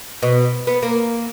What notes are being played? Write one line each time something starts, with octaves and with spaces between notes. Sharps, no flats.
B2
B3
A#3